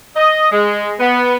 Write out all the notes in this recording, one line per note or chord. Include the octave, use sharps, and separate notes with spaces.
D#5
G#3
B3